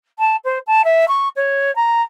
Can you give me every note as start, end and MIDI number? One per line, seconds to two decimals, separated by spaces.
0.19 0.36 81
0.44 0.58 72
0.67 0.82 81
0.84 1.05 76
1.08 1.28 85
1.36 1.73 73
1.75 2.01 82